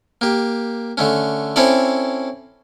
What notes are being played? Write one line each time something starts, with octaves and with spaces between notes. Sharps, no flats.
A#3 G4
D3 A3 C#4
C4 C#4 E4 A4 C#5 D5